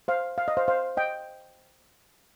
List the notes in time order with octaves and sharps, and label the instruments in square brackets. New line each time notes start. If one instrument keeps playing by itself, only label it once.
[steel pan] C5 F5
F5
D#5
C5 F5
C5 F5
D#5 G5